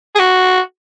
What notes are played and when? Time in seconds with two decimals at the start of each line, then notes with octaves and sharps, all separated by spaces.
0.15 G#4
0.19 F#4